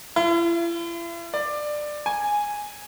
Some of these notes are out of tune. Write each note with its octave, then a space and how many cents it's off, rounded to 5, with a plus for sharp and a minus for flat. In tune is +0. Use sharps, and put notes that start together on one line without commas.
E4 +45
D5 +15
G#5 -5